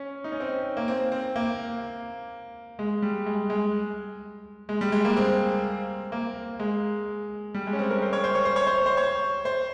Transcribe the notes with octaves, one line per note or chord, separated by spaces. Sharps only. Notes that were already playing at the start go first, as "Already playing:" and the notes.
Already playing: C#4
D#4
C#4
C4
A#3
C4
C4
A#3
G#3
G3
G#3
G#3
G#3
G3
G#3
A#3
C4
A#3
G#3
G3
G#3
C#4
C4
A#4
C5
C#5
C5
C#5
C5
C#5
C5
C5
C#5
C5